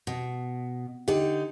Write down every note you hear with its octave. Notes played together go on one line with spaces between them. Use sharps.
B2
D3 D#4 G4